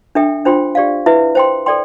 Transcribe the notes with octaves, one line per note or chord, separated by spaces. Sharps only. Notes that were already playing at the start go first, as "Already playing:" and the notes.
D4 A4 E5 G5
D4 F4 C5 G5 C6
G4 D5 F5
E4 B4 E5
C5 G5 C6
A4 D5 G5 C6